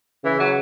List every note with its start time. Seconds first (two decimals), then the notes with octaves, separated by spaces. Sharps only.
0.24 C#3 E3
0.40 F#3